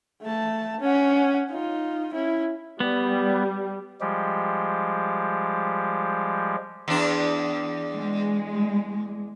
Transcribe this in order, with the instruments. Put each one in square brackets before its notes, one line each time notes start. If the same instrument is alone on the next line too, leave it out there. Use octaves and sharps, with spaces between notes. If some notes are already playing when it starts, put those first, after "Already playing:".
[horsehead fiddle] A3 A5
C#4 F#5
D#4 F4
C#4 E4
[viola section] G3 [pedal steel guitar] B3
[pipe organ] F3 G3 G#3 G4
[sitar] E2 D4
[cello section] G#3